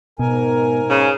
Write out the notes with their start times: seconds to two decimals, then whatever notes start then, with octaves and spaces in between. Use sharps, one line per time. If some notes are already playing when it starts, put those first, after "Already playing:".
0.19 G#2 B2 A#4 G#5
0.90 C#3